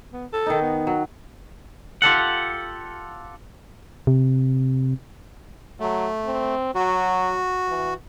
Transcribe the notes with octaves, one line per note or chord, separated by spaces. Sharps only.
B3
A4
D#3 D#4
B3
F#3
F4 G4 A4 F#5
C3
F#3 A3
C4
F#3 F#4
E3